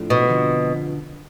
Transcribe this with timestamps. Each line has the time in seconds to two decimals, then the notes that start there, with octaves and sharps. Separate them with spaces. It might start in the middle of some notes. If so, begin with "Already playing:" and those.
Already playing: A2 F3 A3 D4
0.10 B2
0.28 F2 D3 F3